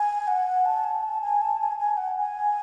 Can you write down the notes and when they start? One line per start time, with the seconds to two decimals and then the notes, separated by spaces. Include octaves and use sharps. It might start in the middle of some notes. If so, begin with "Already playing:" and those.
Already playing: G#5
0.28 F#5
0.66 A5
0.84 G#5
1.03 A5
1.22 G#5
1.42 A5
1.60 G#5
1.79 G#5
1.97 F#5
2.17 G#5